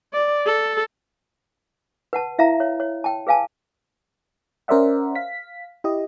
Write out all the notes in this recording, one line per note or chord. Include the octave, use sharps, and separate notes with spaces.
D5
A4
B4 F#5 A5
E4 E5 F5 A#5
C#5
C#5
G5 A5
G#4 B4 F5 G#5 A5
C#4 A#4 C5 D5 E5 F#5
F5 B6
E4 G4 D#5